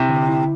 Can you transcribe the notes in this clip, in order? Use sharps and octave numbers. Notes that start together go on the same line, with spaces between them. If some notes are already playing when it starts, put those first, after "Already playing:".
Already playing: C3 E4
D3
E4